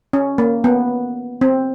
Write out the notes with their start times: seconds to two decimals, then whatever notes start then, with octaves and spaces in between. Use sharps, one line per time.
0.13 C#4
0.38 A#3
0.64 B3
1.41 C4